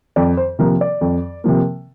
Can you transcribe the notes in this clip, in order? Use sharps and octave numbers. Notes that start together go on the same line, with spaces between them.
F2 D5
C5
C3 F3 A#3 A#4
D5
F2
C3 F3 A#3